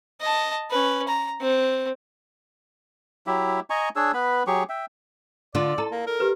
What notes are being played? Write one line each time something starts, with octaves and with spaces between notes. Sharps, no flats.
D#5 A5
C#4 B4
A#5
C4
F#3 E4 G4 E5
D#5 G#5 A#5 C#6
D4 G#4 C#5 E6
B3 B4 B5
F#3 G4 G#4 C#6
E5 G5
D3 D4 F4 D5
E4 A4 A5 A#5
A#3
A#4
G4 B4